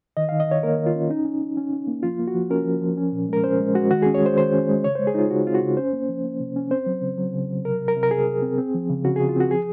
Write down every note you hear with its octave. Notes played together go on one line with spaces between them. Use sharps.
D#3 D#5
D#3 F5
D#5
D#3 C#5
A#3 A#4
D#3
F4
C#4
C#4 D#4
C#4
C#4
C#4
C#4
A#3
F3 F4
A#3
F#4
F3
C#4 A#4
F3
F3
C#4
A#2
G#3 A#4
C#4 C5
G#3
G#3 F#4
D#3 F#4
C#4 G#4
C#5
G#3 C5
D#3 C5
C#4
G#3
C#3 C#5
G#3 C5
G#4
G#3 D#4 F4
C#3 F#4
C4 F4
F#4
C#3
C#4 C5
A#3
F3
A#3
C3
C#4
C4 C5
F#3
C#3
F#3
C#3
F#3
C3 A#4
C3
A#4
C3
A#4
C3 G#4
C3
C4
C4
F3
C#3
C#3 F#4
C#3 G#4
F4
C4 F#4
F3 G#4